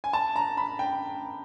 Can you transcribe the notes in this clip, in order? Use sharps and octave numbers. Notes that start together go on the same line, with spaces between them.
G#5
A5
A#5
B5
G5